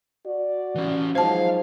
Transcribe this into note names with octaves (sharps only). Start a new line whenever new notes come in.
F#4 D5
E3 C#4
G#2 F3 F#3 C5 F5 A5